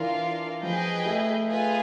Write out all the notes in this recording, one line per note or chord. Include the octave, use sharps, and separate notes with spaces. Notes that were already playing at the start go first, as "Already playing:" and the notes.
Already playing: E3 D4 F4 A#4 D5 F5
F3 G#4 B4 D#5 G5
A3
F4 G#4 B4